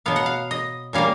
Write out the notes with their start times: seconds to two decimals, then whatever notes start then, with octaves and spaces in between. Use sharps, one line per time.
0.06 B2 F#3 B3 F5
0.16 F#5
0.26 F5
0.51 D#5
0.93 A#2 G3 A#3 C#4 F5